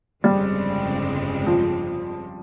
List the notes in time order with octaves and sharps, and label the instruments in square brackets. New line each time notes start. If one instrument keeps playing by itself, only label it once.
[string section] G1 F2 C#3 G#3 C4 [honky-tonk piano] G3
[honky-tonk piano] F3